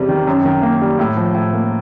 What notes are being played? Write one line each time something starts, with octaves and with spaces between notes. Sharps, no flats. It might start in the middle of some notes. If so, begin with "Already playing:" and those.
Already playing: E2 C3 G3
D#3
F#2
D#3
A#3
G3
A2
F3
A2
A#3